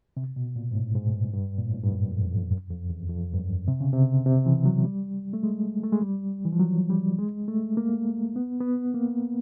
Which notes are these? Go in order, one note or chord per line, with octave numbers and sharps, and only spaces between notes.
C3
B2
A#2
G#2
A2
G#2
G2
G2
A#2
A2
G#2
G2
F#2
F2
E2
F2
F#2
F2
E2
F2
G2
F#2
C3
C#3
C3
C3
E3
F#3
G3
A3
G#3
A3
G#3
G3
E3
F3
F#3
G3
G#3
A3
A#3
B3
B3
A#3